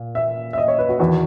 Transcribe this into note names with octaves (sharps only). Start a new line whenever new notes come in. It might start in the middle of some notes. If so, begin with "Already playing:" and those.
Already playing: A#2
E5
E5
D#5
C#5
B4
F#4
E2 D#3 F#4